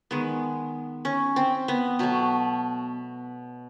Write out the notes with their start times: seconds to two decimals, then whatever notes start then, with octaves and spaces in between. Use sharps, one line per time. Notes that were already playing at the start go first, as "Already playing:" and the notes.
0.11 D#3 G#3 B3
1.05 C#4
1.36 C4
1.68 B3
1.99 B2 F#3 A3